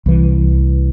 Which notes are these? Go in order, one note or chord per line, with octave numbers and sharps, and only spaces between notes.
C2 E3